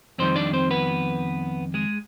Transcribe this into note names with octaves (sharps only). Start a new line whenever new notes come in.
F2 D#3 G3 C4 C5
D4 D5
C4 C5
B3 B4
G#3 G#4